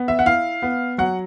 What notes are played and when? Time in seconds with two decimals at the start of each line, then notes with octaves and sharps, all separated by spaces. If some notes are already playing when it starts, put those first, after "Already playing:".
Already playing: B3
0.08 E5
0.19 F#5
0.26 E4 F5
0.62 B3
0.98 F#3 F#5